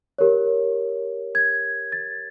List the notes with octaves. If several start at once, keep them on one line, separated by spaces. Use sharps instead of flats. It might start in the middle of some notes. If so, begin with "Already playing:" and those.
G4 A#4 C#5
G#6
A6